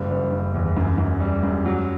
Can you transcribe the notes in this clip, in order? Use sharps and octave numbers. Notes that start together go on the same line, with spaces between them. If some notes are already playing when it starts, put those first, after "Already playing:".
Already playing: F#1 G3
F#1
F#1
E2
F#2
F#2
G3
F#2
F#3